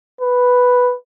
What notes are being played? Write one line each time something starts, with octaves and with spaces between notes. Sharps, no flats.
B4